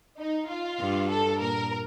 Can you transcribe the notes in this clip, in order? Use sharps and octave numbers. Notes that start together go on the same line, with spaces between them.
D#4
F4
G2
A4
A#2 A#4